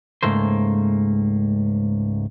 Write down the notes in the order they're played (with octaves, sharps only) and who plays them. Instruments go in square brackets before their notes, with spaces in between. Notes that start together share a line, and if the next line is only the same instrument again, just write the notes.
[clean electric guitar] C#2 G#2 A3 A#3 C5